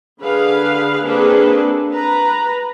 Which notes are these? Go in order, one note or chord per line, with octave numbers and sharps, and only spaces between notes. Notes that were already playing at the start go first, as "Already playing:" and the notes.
D3 G#4 B4 F5
A#3 C4 D4 G#4 A4 B4
B4 A#5